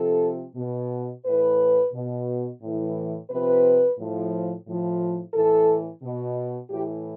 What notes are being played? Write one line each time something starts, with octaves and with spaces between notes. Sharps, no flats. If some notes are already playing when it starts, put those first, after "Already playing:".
Already playing: C3 F3 A4
B2
A2 E3 B4
B2
A2 E3
C3 F3 B4
A2 F3
A2 F3
A2 E3 A4
B2
A2 E3 G4